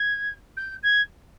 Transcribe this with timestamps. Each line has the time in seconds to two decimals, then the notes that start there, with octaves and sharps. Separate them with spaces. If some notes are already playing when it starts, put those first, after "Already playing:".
Already playing: G#6
0.57 G6
0.83 G#6